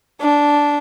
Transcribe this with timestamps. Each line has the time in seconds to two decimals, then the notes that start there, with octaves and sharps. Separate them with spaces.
0.21 D4